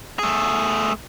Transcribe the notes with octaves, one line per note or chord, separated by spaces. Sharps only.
A3 G#4